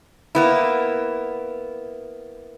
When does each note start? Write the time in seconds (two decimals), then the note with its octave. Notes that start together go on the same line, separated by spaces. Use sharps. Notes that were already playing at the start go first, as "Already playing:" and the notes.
0.35 A#3 B3 E4